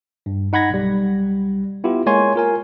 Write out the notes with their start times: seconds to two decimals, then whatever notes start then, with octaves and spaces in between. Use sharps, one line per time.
0.26 G2
0.53 D#4 F#5 B5 G#6 A#6
0.70 B1 G3
1.84 B3 E4 F4 G4
2.06 G#3 A#3 C#5 G#5 C6 G#6
2.35 F4 A#4 G#5